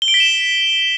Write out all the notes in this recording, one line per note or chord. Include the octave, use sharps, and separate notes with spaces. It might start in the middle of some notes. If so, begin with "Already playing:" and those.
G7
D7
B6
E7